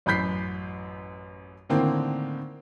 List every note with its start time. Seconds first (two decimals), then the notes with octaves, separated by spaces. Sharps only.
0.06 A1 F#2 B5 G6 B6 C7
1.69 A2 D3 D#3 A#3 C4